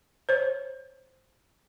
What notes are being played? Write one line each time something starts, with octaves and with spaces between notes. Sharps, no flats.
C5 C#5